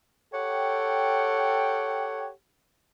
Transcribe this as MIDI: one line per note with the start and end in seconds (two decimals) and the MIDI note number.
0.33 2.29 67
0.33 2.29 69
0.33 2.29 73
0.33 2.29 78
0.33 2.29 79